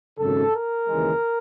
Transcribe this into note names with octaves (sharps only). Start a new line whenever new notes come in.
G#1 F#2 C#3 A4
A#4
D#2 C#3 E3 G#3